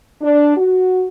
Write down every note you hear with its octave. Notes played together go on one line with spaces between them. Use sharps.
D4
F#4